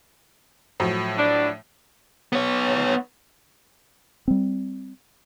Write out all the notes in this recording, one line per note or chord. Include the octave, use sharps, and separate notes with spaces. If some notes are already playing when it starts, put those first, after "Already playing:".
A2 F3 F#3
D4
B3 C#5
G3 C4